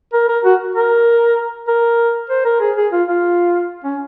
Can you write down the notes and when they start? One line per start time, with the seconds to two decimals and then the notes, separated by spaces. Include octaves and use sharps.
0.13 A#4
0.28 A#4
0.45 F#4
0.76 A#4
1.68 A#4
2.30 C5
2.45 A#4
2.60 G#4
2.76 G#4
2.92 F4
3.08 F4
3.84 C#4